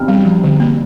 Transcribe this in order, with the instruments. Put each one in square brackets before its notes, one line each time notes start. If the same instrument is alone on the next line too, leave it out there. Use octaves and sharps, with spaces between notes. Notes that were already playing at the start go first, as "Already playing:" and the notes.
Already playing: [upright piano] F6
[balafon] G3
F3
D3
A#3